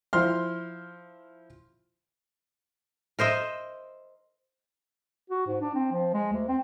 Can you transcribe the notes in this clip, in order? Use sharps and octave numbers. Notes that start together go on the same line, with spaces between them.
F3 E4 C6 F6
A#4 C5 D#5 E5
F#4
G#2
D4
C4
F3
G#3
D2
C4